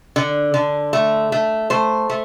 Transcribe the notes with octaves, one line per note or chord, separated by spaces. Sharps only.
D3
D3
A3
A3
A3 C5
A3